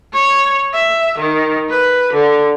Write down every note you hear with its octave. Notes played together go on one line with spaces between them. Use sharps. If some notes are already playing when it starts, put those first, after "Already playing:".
C#5
E5
D#3
B4
D3